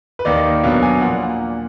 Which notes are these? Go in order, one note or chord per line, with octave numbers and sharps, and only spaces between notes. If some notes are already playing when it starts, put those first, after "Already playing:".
B4
D#2 D#3 A#3 D#4 D5
B2 F#3 D4 F5
G#5
A#2 F3 A#3 F#5